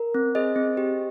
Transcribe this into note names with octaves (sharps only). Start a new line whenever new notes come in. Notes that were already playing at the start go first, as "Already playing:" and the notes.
Already playing: A#4
C4
G#4 C5 D#5
C4
G4